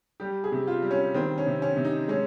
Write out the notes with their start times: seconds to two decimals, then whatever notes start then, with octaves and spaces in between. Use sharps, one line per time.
0.20 G3 G4
0.44 G#4
0.52 C3
0.67 F4
0.82 G3
0.91 C#4
1.14 D#3 C4
1.38 C#4
1.46 C3
1.62 C#4
1.77 C3
1.85 D#4
2.08 G#3 C#4